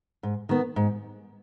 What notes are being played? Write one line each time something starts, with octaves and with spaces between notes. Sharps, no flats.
G#2
D#3 B3
G#2